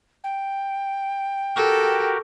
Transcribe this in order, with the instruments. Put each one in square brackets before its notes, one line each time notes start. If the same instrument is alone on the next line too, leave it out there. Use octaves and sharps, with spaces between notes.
[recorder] G5
[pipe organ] F#4 G4 A#4 [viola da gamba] A4